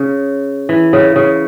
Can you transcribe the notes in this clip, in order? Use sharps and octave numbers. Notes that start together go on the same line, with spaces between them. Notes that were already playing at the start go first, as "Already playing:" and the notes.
Already playing: C#3
E3
C#3
C#3